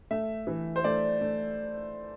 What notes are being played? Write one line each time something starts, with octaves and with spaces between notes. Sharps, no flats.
A3 E5
E3
C5
A3 D5
A3